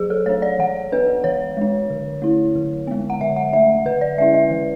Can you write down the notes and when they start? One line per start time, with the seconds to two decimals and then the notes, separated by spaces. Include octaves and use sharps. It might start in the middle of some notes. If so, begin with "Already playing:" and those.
Already playing: F#3 G#4
0.10 A4
0.26 A3 D4 C#5
0.42 D5
0.59 E3 F#5
0.92 B3 D4 B4
1.24 E3 C#5
1.57 G#3 D4
1.90 D3
2.22 A3 E4
2.55 D3
2.87 G#3 B3
3.10 F#5
3.21 D3 E5
3.36 F#5
3.53 A3 D4 E5
3.85 D3 B4
4.01 D5
4.18 G#3 C#4 E4 E5
4.34 E5
4.51 E3